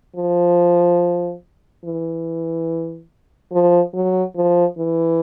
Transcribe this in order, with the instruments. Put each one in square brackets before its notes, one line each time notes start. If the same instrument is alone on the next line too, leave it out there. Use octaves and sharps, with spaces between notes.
[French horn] F3
E3
F3
F#3
F3
E3